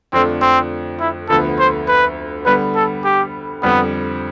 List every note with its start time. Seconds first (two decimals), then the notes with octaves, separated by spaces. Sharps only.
0.13 F2 D3 A3 C4 D4 F4
0.41 C4
1.00 E4
1.29 D2 D3 F3 B3 A4
1.59 C5
1.88 B4
2.46 D3 G3 B3 B4
2.76 A4
3.05 G4
3.63 F2 D3 G3 B3